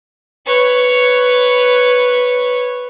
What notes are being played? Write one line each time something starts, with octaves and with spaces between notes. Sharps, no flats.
B4 C#5